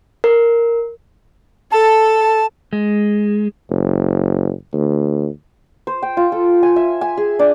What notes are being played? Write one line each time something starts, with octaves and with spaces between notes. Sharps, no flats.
A#4
A4 A5
G#3
F#1
D2
C5
G5
F4
A4
G#5
E5
G#5
G#4
D4